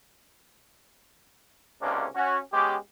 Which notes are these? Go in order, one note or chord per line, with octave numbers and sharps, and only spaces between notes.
C#2 G#2 C3 A#3 C#4 D4
C#4 F#4
G#3 B3 C#4 G4